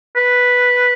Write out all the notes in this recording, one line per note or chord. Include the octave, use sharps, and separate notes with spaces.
B4